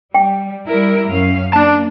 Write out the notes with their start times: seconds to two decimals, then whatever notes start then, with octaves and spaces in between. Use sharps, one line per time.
0.14 G3 G5
0.67 G3 E4 A#4
1.10 F#2 C#4 F5
1.53 A#3 D4 A5